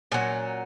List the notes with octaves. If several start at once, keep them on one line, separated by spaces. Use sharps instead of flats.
A#2 F#3 C#4